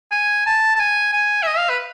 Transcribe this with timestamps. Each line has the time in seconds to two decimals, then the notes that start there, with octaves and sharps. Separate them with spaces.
0.11 G#5
0.46 A5
0.76 A5
0.80 G#5
1.13 G#5
1.43 E5
1.47 D#5
1.58 F5
1.69 B4